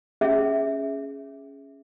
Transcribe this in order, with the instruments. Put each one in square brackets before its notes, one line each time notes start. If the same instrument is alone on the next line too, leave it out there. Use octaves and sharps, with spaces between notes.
[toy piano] C#4 G#4 E5